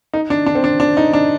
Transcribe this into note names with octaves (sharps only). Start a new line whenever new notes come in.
D#4
D4
D4
C4
D4
D4
D#4
D4